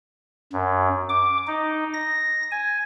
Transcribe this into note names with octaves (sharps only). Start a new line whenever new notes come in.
F#2
D6
D#4
A#6
G#5